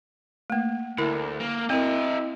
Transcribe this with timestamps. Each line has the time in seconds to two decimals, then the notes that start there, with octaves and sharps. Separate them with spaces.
0.50 A3 A#3
0.98 D2 E4 A#4
1.40 A#3
1.70 C4 E4 A#4 D#5